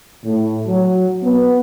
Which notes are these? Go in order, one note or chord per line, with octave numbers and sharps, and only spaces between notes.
A2
F#3
B3